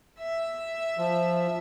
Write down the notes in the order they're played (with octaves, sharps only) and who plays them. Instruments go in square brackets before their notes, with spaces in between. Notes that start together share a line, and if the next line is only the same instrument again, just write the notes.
[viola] E5
[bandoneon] F3